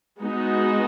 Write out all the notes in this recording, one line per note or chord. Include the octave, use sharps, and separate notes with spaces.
G#3 B3 D#4 F#4